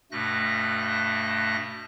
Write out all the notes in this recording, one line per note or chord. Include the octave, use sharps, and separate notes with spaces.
G2 B2 A3 F#6 A#6